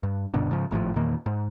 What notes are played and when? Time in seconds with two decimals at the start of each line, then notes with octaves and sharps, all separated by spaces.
0.03 G2
0.34 D#1 G2 B2 D3
0.51 G#2 C#3 F3
0.71 G#1 A2 D3 F3
0.95 E2 A#2 D#3 A#3
1.26 G#2